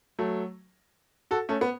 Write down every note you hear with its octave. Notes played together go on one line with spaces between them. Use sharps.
F#3 A3
F#4 A4
A3 C#4
B3